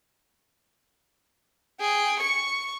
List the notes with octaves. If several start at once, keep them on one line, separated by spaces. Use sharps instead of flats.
G#4 G5
C#6 C#7